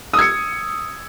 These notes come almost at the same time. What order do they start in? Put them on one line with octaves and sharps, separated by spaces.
D#6 E6 G#6 C#7